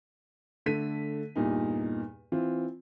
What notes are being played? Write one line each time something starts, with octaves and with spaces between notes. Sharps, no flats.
D3 A3 B6 D#7
E2 G2 A#2 D#4
E3 C4 F4